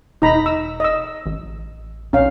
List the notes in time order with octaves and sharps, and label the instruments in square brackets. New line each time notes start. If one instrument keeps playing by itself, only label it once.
[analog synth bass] E1 [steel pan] D#4 A#5 B5
[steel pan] E6
D#5 E6
[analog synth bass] A1
[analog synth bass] B1 [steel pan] C#4 F5